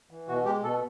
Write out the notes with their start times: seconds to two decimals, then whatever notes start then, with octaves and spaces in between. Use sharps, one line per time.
0.11 E3
0.28 B2 F#4
0.45 G#3 G4
0.63 B2 A4